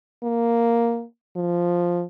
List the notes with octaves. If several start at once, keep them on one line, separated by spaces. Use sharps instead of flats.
A#3
F3